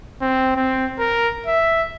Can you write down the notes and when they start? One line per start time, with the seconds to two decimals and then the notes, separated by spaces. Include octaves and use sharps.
0.22 C4
0.56 C4
0.99 A#4
1.47 E5